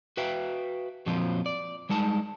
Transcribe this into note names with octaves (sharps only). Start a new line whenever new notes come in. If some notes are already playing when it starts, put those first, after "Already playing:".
F#4 B4 E5 F5 G5
F2 A#2 F3 F#3 C4 F4
D5
G3 G#3 D#4 A5